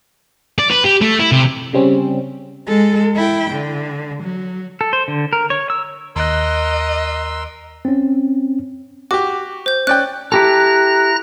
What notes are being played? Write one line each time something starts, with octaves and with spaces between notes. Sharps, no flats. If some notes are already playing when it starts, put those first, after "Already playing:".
D5
B4
G4
A3
E4
C3
C#3 G3 C4 C#4
G#3 A4
E4 G5
D3
F#3
A4
C5
D3
A#4
C#5
E6
D#2 A#4 D#5 C6 E6 F#6
C4 C#4
F#4 G4 D6
C5 G6
C#4 D5 G5 F#6
E4 G4 A4 A#5 F#6 A#6